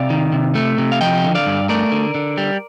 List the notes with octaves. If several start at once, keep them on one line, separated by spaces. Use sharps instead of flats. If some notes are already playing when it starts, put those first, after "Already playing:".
Already playing: C3 D5 F5
D#3
C3
A3
C3
F5
F3 D#5 G5
D3
D5 F5
G2
A3 A#4 D5
D3
D3
G3